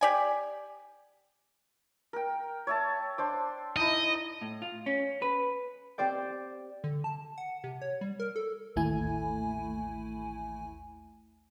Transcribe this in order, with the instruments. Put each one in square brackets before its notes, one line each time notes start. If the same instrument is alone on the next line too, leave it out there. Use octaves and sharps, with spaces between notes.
[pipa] G4 D5 G#5
[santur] A#4 G5
C#5 E5 A5
D4 C5 D6
[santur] D#4 E4 [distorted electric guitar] D#5
[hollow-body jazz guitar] A2
F4
C#4
B4
[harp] C4 G4 C5 D5 G5
[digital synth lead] D3
A5
F#5
C3
C#5
G3
A#4
A4
[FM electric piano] A1 D#2 A3 E4 G#5